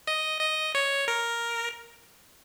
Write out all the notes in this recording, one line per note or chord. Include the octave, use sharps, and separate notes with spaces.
D#5
D#5
C#5
A#4